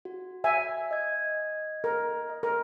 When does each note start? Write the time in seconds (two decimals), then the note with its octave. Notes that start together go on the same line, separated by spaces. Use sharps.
0.05 F#4
0.44 E5 G#5
0.91 D#5 G#6
1.84 A#4
2.30 D#5
2.43 A#4